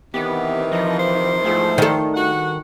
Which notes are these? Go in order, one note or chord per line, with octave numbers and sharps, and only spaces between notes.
C3 D#3 E3 B3 G4
F3 D#4
C5
E2 G#2 F3 A3
D#3 A4
G2 F#4 F#5